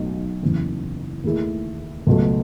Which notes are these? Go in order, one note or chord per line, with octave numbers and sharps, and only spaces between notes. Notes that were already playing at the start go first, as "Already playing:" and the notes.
Already playing: B1 B2 F#3 A3 D#4
F#1 E2 C#3
D#2 D#3 A3 E4 G#4
C#2 B2 F#3 A3